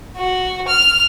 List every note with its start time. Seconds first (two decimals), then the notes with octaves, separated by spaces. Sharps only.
0.17 F#4
0.68 F6